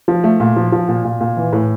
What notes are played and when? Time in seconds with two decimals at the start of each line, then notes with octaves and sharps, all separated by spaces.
0.08 F3
0.24 A3
0.40 A#2
0.56 F3
0.72 F3
0.89 A#2
1.05 A#2
1.21 A#2
1.37 E3
1.53 A2